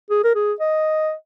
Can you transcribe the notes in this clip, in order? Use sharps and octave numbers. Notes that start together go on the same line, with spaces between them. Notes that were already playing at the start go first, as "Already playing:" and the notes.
G#4
A#4
G#4
D#5